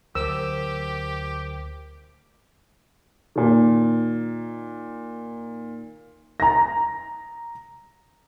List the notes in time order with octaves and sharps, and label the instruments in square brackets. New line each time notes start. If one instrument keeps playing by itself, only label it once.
[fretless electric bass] D2 F#3 [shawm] G4 [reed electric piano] A#4 C5 [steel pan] E6
[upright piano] A#2 D#3
A#5 A#6